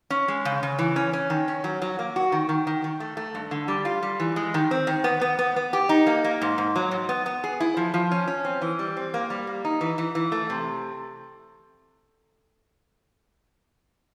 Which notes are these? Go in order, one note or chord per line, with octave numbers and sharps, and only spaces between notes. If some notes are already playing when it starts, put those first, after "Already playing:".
C#4
G#3
C#3
C#3
E3
C#4
C#4
D#3
C#4
F#3
F#3
A#3
F#4
D#3
D#3
D#3
D#3
A3
A3
G2
D3
G3
F4
G3
E3
G#3
D#3
C4
D#3
B3
B3
B3
B3
G4
D#4
A#3
A#3
G#2
G#2
F#3
G#2
B3
B3
G#4
E4
F3
F3
C#4
C#4
C4
E3
G3
C4
A#3
G3
A#3
D#4
E3
E3
E3
A3
C3